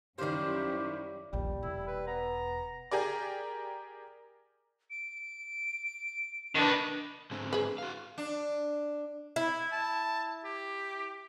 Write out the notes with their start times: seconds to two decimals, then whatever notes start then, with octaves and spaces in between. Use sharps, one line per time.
0.18 F#2 D#3 G3 C#4 E4 G4 C5 F5
1.33 A#1 D#2 G3
1.63 E1 E4
1.87 B4
2.07 B3 A#5
2.91 G4 G#4 A#4 D5
4.90 D7
6.55 D#3 D4 B4
7.31 G#2 D3 C4
7.53 G#4 B4
7.78 F#4 F5
8.18 D4
9.36 E4
9.72 A5
10.45 G4